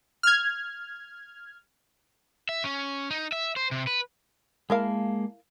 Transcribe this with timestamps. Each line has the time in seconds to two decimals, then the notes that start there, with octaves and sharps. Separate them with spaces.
0.23 F6 G#6
2.49 E5
2.64 C#4
3.11 D#4
3.32 E5
3.56 C5
3.71 C3
3.87 B4
4.70 G#3 A#3 E4 A#4 F5 A5